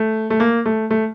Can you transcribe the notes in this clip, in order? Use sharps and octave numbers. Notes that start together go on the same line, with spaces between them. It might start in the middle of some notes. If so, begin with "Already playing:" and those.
Already playing: A3
A3
A#3
A3
A3